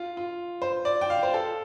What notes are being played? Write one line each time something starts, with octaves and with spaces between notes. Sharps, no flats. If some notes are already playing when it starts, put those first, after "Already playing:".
Already playing: F4
F4
C5
D5
G5
F5
C5
A4